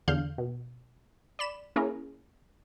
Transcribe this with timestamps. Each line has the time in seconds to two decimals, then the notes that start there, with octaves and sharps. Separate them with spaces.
0.08 E2 D3 F5 F6 G6
0.38 B2
1.39 D5 B5 E7
1.76 A#3 C#4 E4 G#4 A#4